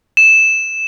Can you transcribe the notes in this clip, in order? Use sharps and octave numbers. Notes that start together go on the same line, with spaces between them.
E7